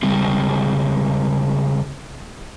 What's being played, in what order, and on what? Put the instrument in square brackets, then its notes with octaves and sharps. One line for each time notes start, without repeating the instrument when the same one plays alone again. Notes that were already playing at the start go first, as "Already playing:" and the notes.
[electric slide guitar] C#3 G3 G#3 C4